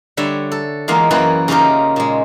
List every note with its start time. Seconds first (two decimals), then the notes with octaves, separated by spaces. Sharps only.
0.17 D3 G3 C#5 E5
0.52 A4
0.88 E2 G#3 A#3 F4 F5
1.11 F#2 E3 F#3 A#3 G#4 B4
1.48 C#3 D#4 F4 G4 A#4
1.96 A#2 G#3